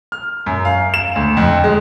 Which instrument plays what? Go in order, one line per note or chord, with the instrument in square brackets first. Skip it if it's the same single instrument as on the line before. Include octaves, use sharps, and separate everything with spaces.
[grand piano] F6
F#2
F5
E7
D2
F2
G#3